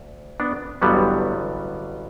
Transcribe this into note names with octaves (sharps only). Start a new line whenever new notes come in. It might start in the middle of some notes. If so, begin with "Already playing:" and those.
Already playing: D2
B3 D4
A1 G2 D3 F#3 G3 B3